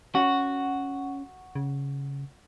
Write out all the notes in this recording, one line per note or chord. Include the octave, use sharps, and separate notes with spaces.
C#4 F#4
C#3